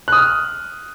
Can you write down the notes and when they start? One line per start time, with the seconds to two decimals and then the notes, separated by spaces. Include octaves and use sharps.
0.08 F#6
0.12 D#6
0.17 F6